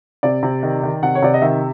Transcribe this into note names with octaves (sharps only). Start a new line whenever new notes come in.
C3 D5
C3
D#3
D#3
C3 F#5
C#5
C3 D5
D#5
D#3 E5